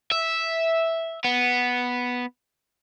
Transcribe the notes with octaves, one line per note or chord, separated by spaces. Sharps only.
E5
B3